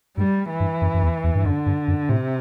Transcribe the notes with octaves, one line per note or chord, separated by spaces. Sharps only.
G2 G3
E3
G2
F#2
F#2
E2
E2
G2
F#2 D3
G2
F#2
A2 C3